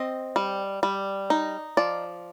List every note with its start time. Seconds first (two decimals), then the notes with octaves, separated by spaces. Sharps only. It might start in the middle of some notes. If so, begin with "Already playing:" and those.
Already playing: C4 D#5
0.36 G3
0.83 G3
1.30 D#4
1.77 F3 D5